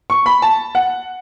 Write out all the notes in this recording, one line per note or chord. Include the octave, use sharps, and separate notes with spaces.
C#6
B5
A5
F#5